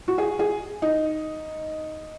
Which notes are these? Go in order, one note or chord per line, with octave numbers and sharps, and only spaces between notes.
F#4
G#4
G#4
D#4